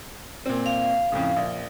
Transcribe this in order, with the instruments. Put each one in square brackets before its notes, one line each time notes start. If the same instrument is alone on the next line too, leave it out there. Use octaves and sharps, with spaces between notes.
[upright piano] A#2 C4
[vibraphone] F5
[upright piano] F2 A2 C#3
A#1